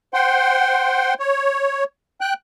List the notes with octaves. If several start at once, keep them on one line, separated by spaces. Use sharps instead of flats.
C5 F#5 G5 C6
C#5
G5 F#6